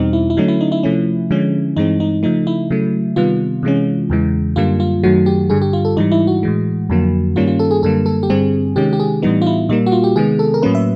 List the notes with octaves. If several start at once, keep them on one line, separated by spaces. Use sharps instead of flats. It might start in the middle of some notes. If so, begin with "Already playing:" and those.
Already playing: E2 B2 G3 C4 D#4
E4
E4
D3 F#3 A3 C#4 D#4
E4
D#4
E4
C3 F3 A3 C#4
D3 F3 G#3 C#4
G2 E3 G#3 C4 D#4
D#4
C#3 F3 A3 D#4
E4
C#3 F#3 A3
C3 D#3 G3 B3 F4
C3 E3 G#3 C#4
E2 C#3 E3 G#3
F#2 D3 G3 A#3 F4
F4
F#2 D#3 F#3 A3 F#4
G4
G2 D3 G3 G#4
G4
F4
A4
G#2 E3 G3 D#4
E4
F#4
A2 E3 G#3
F2 D3 F#3 A#3
G2 D#3 G3 A#3 C#4 F4
F4
A4
G#4
F#2 D3 G3 A#3 A4
A4
G4
G2 D3 G3 C4 G#4
C3 D#3 G#3 C#4 G4
G4
G#4
A2 E3 G3 B3 D#4
F4
E4
A#2 G3 A#3 D#4
F#4
F4
G4
C3 D#3 G#3 B3 G#4
A4
A#4
A2 F#3 A#3 C#4 B4
E5